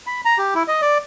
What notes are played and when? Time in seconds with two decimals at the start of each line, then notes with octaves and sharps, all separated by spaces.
0.07 B5
0.25 A#5
0.38 G4
0.55 E4
0.68 D#5
0.82 D5